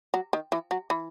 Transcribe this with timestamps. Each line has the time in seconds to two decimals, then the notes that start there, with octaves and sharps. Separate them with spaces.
0.14 F#3
0.33 D#3
0.52 E3
0.71 F#3
0.90 E3